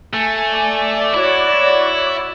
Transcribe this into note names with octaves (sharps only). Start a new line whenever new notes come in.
A3 G#5
D5
E4 F#4 C#5